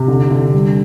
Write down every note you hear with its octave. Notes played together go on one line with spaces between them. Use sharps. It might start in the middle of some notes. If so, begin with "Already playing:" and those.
Already playing: C3
D3
D3
G3